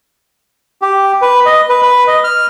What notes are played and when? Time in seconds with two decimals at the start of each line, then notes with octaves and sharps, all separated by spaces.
0.82 G4
1.22 B4
1.46 D#5
1.69 B4
1.82 B4
2.07 D#5
2.24 F6